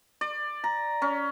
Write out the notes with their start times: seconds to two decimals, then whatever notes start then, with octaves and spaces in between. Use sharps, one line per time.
0.21 D5
0.64 A#5
1.02 C#4